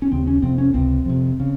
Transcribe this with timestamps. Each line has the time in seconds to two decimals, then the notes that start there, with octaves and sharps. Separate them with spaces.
0.02 C#4
0.12 D#2 C#3 C4
0.27 C#4
0.42 F2 C3 C4
0.58 C#4
0.74 C#2 C3 C4
1.05 F2 C3
1.40 C#3